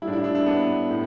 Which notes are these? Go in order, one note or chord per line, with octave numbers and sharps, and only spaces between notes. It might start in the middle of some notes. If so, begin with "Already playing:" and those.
A2 G3 D4 E4
E4
D4
D4
B3
A2